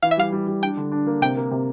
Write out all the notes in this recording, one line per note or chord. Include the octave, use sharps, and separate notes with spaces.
E3 F5
E5
G3 F5
G3
G3
D4 G5
D3
D4
A#3
C3 G5
A#3
C3